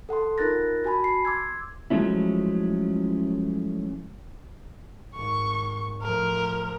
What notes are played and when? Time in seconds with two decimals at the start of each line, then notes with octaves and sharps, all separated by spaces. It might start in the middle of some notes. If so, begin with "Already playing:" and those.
0.09 A4 F#5 A5 C6
0.38 D#4 F4 A#4 F#6 A6 A#6
0.84 F#4 G#5 A5 B5
1.04 C7
1.25 C6 D6 E6 G#6
1.90 F3 F#3 G#3 A3 C#4 E4
5.15 G#1 C#6
6.02 A2 F3 A#4